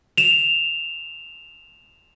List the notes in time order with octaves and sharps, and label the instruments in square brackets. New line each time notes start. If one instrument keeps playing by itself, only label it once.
[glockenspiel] E7 F7